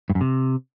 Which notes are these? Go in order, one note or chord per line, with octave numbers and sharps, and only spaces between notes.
G2
F#2
C3